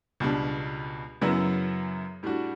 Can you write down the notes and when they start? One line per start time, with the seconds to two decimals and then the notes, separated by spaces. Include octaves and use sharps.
0.20 C#2 B2 G3 D4
1.21 F#2 C#3 F#3 B3 E4
2.23 A2 G3 D4 F#4